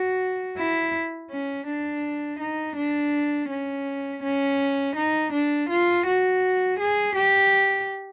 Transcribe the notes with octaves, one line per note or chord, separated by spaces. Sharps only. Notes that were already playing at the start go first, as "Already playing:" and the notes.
Already playing: F#4
E4
C#4
D4
D#4
D4
C#4
C#4
D#4
D4
F4
F#4
G#4
G4